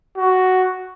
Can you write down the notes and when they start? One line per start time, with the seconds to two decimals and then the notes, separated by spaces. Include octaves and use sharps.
0.17 F#4